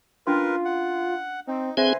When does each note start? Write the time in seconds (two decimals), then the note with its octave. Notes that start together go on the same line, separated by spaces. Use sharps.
0.27 C#4 D4 F4 A#4 B4 C6
0.65 F#5
1.47 C4 D#4
1.77 D3 C4 G#4 B4 C5 E5 G#5 C6